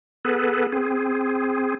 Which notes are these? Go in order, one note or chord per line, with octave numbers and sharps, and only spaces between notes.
B3 G#4 A4 B4
C4 G#4